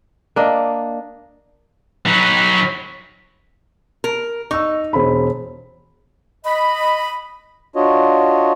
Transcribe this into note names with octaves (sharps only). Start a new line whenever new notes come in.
A#3 D4 D#5
F#3 D#4 B5
A#4
D#4 C#6 E6
E1 C5 B5
D#5 B5
D4 F4 F#4 C#5 D#5